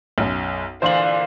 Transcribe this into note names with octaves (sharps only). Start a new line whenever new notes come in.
B1 F#2
A#2 D3 E3 C5 F5 C6 F#7